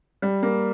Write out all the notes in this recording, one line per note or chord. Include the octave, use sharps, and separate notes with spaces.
G3
A#3